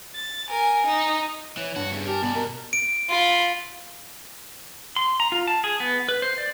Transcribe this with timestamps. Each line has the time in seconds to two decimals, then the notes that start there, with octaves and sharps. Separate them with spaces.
0.14 A6
0.49 A#4 G#5
0.86 D#4
1.57 E3 C#5
1.76 G2 F#4
1.92 E2 C#3
2.07 G4 A#4 G#5 A5
2.23 B2 B3 D5
2.35 B2 A#4
2.73 D7
3.09 F4 B5
4.96 C6
5.20 A#5
5.32 F4
5.48 A5
5.64 G#4
5.80 B3
6.09 B4
6.22 C5
6.38 D5